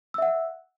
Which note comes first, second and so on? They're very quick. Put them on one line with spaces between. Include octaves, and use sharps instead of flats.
E6 E5 F#5